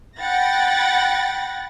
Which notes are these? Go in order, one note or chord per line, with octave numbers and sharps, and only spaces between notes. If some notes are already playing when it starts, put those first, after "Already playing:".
F#5 G5 B5 A6 A#6